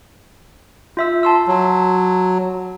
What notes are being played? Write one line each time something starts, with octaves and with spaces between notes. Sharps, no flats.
F4 E5 E6
A5 C6 E6
F#3